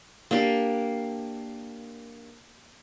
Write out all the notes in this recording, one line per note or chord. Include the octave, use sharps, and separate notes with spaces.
A#3 D4 G4